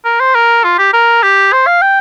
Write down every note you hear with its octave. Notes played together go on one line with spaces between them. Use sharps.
A#4
C5
A#4
F4
G4
A#4
G4
C5
F5
G5